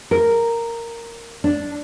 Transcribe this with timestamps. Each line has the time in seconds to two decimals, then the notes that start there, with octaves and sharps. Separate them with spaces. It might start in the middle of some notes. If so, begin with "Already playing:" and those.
0.11 A#4
1.44 D4